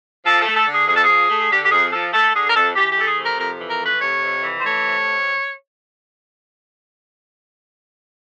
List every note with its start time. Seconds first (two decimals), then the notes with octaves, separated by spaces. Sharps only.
0.25 F3 A4
0.40 A4
0.46 A3
0.56 A4
0.67 D3
0.72 G#4
0.88 F2 G#4
0.96 A4
1.04 G#4
1.09 F3
1.29 A3
1.40 G#4
1.51 D3 G4
1.64 G4
1.71 F2 G#4
1.92 F3 A4
2.13 A3 A4
2.34 D3 G#4
2.49 A#4
2.55 F2 A4
2.76 E3 G4
2.92 G4
2.97 A3 A4
3.08 G#4
3.18 C3
3.23 A#4
3.39 F2 A#4
3.60 E3
3.70 A#4
3.80 A3
3.86 B4
4.01 C3 C#5
4.23 F2
4.43 E3
4.60 C5
4.64 A3 C#5
4.85 C3